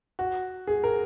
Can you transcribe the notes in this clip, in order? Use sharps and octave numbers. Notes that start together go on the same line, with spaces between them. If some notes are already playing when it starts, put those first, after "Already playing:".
F#4
G#4
A#4